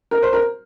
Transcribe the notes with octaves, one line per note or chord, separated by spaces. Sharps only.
A#4
C5
A#4